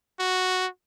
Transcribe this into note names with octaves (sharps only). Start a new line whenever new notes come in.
F#4